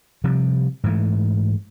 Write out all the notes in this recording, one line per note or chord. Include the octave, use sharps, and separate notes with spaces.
C3 F3 G3
G#2 E3 A3